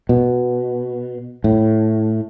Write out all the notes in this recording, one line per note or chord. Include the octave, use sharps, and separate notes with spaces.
B2
A2